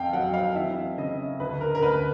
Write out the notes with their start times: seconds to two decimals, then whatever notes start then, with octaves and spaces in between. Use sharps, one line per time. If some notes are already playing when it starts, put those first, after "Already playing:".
Already playing: F2 F5 G5
0.13 F#3 F#5
0.34 F5
0.55 E3 E5
0.97 C#3 D#5
1.40 D2 B4
1.61 A#4
1.75 A#4
1.82 D2 B4